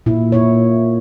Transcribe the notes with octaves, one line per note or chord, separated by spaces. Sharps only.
A#2 E4
A#2 E4 C#5